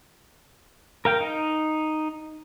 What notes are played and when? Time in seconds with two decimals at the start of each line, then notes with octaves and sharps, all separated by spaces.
1.05 A#4 F5 G5
1.20 D#4